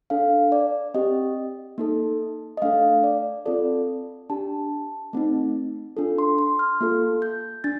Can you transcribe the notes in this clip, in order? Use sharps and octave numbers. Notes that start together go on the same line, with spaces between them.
D4 A4 F5
D5
C4 G4 D#5
A#3 D#4 A4
D#5
A3 D4 A4 F5
D5
C4 F4 A4 D5
D4 G4 A5
A3 C4 D#4
D4 F4 A4
C6
C6
F6
A#3 F4 A4
G6
D4 A6